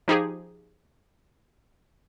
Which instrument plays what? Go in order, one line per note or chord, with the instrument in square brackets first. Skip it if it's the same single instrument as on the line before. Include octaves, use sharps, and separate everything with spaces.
[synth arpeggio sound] F3 D#4 G4 G#4